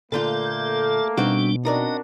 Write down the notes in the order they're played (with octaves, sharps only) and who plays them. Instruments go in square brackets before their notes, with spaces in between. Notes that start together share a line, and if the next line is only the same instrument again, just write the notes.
[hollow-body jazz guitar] A#2 D3 F4 [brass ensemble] A3 A#3 [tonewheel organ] A4 [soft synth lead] G6
[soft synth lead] B2 [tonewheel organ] G3 D4 [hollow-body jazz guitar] C4 D#4 F#4
[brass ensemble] C4 D4 F#4 [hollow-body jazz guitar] D#4 A#4 D5 [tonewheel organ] D#5